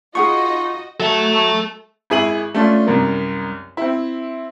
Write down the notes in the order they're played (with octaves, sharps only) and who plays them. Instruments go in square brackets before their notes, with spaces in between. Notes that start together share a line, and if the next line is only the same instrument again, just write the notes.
[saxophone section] D#4 F4 [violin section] F#4 D#5 [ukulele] G#4 F#5 B5 [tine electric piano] C#6
[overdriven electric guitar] F#3 [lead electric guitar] A4 E5
[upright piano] G#1 E4 G#4 D#7 F#7
A3 C#4 D4 F4
C2 F#2 A#4
C4 E4